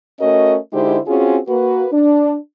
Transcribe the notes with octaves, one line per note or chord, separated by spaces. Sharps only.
A3 C#4 F#4 A#4 D#5
D3 G#3 D#4 E4 G4 C5
C4 C#4 F4 F#4 G#4
A#3 F#4 B4
D4